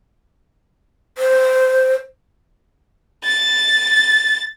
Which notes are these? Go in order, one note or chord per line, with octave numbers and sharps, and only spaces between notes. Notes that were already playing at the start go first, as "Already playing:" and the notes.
C5
A6